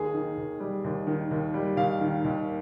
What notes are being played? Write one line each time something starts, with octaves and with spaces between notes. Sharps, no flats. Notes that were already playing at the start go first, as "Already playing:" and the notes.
Already playing: D#2 G#4
D#3
D#2
G3
D#2
D#3
D#2
G3
D#2 F5
D#3
D#2